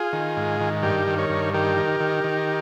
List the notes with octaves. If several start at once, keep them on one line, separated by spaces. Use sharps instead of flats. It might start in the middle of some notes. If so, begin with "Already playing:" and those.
Already playing: F4 G#4
D#3
G#2
D#3
G2 G4 A#4
D#3
A#4 C#5
G2
D#3 G4 A#4
D#3
D#3
D#3